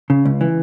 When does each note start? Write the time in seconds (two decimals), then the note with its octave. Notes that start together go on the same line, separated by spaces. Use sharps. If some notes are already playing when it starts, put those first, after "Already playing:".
0.10 C#3
0.25 C#2
0.41 E3